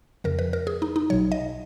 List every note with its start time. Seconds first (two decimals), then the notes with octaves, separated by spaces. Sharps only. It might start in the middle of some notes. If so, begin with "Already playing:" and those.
0.24 F2 C#3 F3 A#4
0.39 B4
0.53 A#4
0.67 G#4
0.82 D#4
0.96 D#4
1.10 B1 B2 F#3 C#5
1.32 D#5